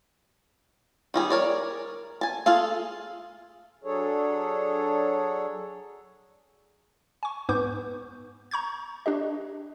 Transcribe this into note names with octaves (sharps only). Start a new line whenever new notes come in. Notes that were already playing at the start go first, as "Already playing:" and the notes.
D#3 G3 G#4
A#4 C#5 D5
G#5 A5
F4 G#4 A4 F5
F#3 D4 G#4 A4 C#5
G#5 C#6
G#2 B3 B4 C#6 D6 G6
A#5 C#6 G6 G#6
D4 G4 D#5